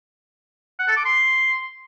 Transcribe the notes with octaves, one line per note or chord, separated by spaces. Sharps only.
F#5
A4
D6
C6